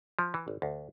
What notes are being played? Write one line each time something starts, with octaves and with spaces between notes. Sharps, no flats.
F3
E3
G#1
D2